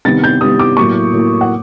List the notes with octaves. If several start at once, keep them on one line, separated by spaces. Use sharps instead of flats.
C3 D#3 G3 B3 A6
G6
C3 D#3 G3 B3 D#6
D6
A2 F#3 A#3 C#6
A2 F#3 A#3
F#5